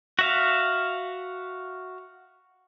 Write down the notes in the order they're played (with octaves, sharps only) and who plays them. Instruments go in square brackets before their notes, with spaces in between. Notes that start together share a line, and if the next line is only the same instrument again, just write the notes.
[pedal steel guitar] F#4 E5 F5